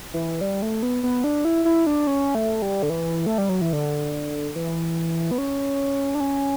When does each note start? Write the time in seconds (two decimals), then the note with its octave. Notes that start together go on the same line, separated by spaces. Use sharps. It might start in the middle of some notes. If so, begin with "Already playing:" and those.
0.14 E3
0.41 G3
0.62 A3
0.83 B3
1.03 B3
1.24 D4
1.45 E4
1.65 E4
1.87 D4
2.07 C#4
2.35 A3
2.62 G3
2.83 D3
2.90 E3
3.26 A3
3.38 G3
3.49 F#3
3.61 E3
3.73 D3
4.56 E3
5.31 B3
5.38 C#4
6.15 D4
6.20 C#4